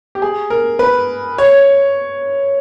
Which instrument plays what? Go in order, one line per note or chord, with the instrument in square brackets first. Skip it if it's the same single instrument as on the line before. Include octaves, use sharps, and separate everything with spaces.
[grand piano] G4
G#4
A#4
B4
C#5